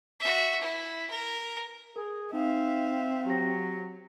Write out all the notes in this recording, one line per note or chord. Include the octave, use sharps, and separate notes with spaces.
F#4 E5
E4
A#4
G#4 A#4
C4 D#4 E5 F5
F#3 G4 A#6